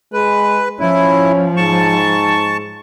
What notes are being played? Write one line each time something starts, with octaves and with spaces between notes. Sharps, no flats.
G#3 B4
F3 C#4 E4
G#2 A5 C#6